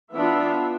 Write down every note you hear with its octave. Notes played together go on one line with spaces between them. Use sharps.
E3 B3 D4 F4 E5